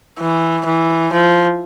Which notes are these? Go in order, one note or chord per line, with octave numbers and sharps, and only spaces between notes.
E3
E3
F3